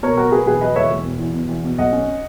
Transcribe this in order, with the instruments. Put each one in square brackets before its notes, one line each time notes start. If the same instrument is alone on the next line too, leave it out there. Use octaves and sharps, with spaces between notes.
[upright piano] B2 A#4 C#5
F#3 F#4 A#4
B2 G#4 B4
E1 G#4 B4
F#3 B4 D#5
E1 C#5 E5
E1
B2
E2
B2
E2
B2
B1 D#5 F#5
C#4